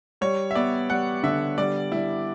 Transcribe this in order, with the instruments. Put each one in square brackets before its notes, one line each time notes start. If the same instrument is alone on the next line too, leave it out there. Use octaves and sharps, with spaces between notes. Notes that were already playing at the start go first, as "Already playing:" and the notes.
[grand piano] G3 [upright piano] C#5
[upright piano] E5
[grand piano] B3 [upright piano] D5
[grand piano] G3 [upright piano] F#5
[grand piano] D3 [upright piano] E5
[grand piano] G3 [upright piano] D5
[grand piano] G3 [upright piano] E4